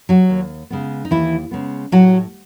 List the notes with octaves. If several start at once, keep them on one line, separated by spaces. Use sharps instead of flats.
F#3 F#4
D#2
C#3 G#3 B3
D#4
D#2 E3 E4
C#3 G#3 B3
A2 F#3 F#4